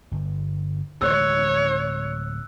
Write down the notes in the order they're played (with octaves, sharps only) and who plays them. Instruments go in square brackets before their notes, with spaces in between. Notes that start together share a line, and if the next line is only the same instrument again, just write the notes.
[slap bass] G1
[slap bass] D1 G#3 [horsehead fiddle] C#5 [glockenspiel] E6 F#6